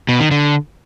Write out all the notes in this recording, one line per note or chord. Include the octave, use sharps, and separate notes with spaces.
B2
D#3
D3